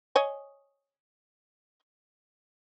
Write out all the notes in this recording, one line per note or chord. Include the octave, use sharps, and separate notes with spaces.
C#5 D#5 G#5